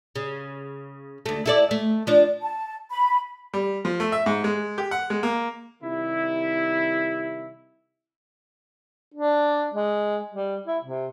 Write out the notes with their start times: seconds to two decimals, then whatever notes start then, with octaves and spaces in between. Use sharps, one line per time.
0.16 C#3
1.26 D2 A3
1.46 E4 A4 D5
1.71 A3
2.07 F3 D4
2.41 A5
2.90 B5
3.54 G3
3.85 F3
4.00 A3
4.12 E5
4.26 G#2
4.44 G#3
4.78 G4
4.91 F#5
5.10 G#3
5.23 A#3
5.83 C3 D#3 G3 E4
9.14 D4
9.74 G#3
10.31 G3
10.66 E4
10.84 C3